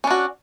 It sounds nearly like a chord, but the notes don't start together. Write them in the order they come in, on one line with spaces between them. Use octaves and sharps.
C#4 D4 F#4